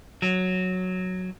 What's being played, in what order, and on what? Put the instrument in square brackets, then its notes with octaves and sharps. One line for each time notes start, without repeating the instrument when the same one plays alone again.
[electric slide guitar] F#3